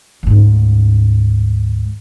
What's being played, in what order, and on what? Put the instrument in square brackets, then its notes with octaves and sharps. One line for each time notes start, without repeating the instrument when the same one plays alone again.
[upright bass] D2 G#2